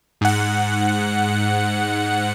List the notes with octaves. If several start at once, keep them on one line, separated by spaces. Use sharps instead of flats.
G#2 F#5